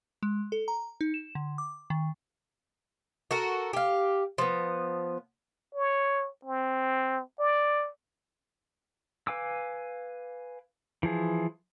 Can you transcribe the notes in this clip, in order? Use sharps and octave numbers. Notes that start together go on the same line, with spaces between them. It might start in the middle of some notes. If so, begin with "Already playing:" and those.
G#3
A4
A#5
D#4
E7
D3
D6
D#3
F#4 A4 A#4
G4 F5
F3 B3
C#5
C4
D5
B4 F5 G#5 D6 E6
E3 F3 G#4